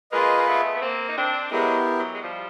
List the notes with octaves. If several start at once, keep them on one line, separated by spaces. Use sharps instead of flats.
G#3 A#3 F4 G#4 B4 D#5
A#3
A3 B3
B3
A#3 C4
D#4
C4 D4
F#3 G#3 B3 E4 G4 A#4
E3 F#3
G#3
F3 G3